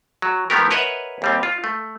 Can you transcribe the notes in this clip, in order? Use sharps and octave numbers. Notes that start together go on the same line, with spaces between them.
F#3
D#3 F3 A3 B3 G4 A#4
A#4 B4 C#5 D#5 E5 F#5
D#2 G3 C4
F4
A3